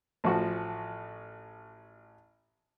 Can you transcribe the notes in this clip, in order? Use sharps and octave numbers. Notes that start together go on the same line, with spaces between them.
A1 F3 F#4